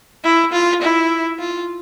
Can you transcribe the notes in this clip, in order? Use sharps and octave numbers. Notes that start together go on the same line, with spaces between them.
E4
F4
E4
F4